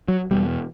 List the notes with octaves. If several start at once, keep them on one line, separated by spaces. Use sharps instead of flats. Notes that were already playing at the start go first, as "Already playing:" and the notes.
F#3
E2 B2 G3